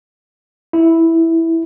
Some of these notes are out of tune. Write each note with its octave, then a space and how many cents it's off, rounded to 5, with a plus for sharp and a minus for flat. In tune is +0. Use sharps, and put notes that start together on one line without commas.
E4 -5